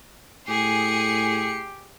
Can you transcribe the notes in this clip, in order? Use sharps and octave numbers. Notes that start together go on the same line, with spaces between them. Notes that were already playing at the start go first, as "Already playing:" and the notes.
A2 G4 G#4 C7 C#7